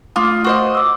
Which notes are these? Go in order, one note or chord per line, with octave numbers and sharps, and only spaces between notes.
A3 F4 D6 D#6
F#4 C5 D#5
D6 E6